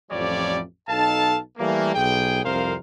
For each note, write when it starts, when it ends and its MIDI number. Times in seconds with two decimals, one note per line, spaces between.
0.11 0.60 33
0.11 0.60 41
0.11 0.60 53
0.11 0.60 55
0.11 0.60 73
0.11 0.60 74
0.89 1.40 35
0.89 1.40 63
0.89 1.40 69
0.89 1.40 77
0.89 1.40 81
1.58 1.92 52
1.58 1.92 55
1.58 1.92 57
1.58 1.92 58
1.95 2.44 35
1.95 2.44 68
1.95 2.44 79
2.44 2.75 36
2.44 2.75 41
2.44 2.75 70
2.44 2.75 72
2.44 2.75 77